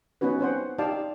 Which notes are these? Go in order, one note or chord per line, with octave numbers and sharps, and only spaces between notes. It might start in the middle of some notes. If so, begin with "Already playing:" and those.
B3 C#4 D#4 F#4 B4
C4 C#4 C5 F#5
D#4 G4 D5 F5 G5 A5